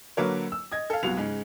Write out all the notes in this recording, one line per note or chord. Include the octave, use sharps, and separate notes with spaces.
D3 F#3 A#3 A#4 B4 C#5
E6
D#5 G#6
A4 F5
C2 F#3 B3 F4 F#4 F7
G#2 C#3